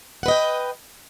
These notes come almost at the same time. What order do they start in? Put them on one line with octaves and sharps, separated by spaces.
F#5 B4 D#5 G5